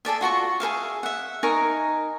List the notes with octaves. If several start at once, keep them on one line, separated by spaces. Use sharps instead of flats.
G#4 A4 D5 E5
F4 F#4 A#5 C#6
G#4 B4 E5 F5
E5 F#5
D#4 A#4 G#5 C#6